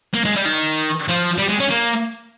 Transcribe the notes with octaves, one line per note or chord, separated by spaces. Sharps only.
A#3
G#3
G3
D#3
F3
G3
G#3
C#4
A#3